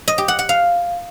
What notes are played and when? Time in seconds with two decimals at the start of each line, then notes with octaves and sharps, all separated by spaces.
0.08 D#5
0.18 G4
0.28 F#5
0.39 F#5
0.49 F5